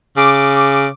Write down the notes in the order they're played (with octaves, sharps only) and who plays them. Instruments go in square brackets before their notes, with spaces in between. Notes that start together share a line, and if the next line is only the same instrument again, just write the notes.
[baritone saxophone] C#3 [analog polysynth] D6